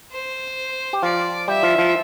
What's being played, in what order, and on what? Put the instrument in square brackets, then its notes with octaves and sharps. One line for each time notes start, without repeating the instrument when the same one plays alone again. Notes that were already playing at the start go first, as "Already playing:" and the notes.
[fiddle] C5
[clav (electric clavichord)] G4
[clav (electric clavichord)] F3 F4 [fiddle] D5
[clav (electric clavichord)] G3 G4 [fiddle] E5
[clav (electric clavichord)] F3 F4
F3 F4